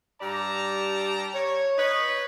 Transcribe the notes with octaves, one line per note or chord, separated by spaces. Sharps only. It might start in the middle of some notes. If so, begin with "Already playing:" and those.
G2 G3 G4 D5 A5 A#5
C#5
D#4 B4 C#5 D#5